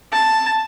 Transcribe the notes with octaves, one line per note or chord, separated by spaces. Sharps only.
A5